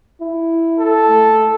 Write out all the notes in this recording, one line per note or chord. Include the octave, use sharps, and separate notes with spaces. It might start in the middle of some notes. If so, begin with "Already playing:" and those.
E4
A4
A3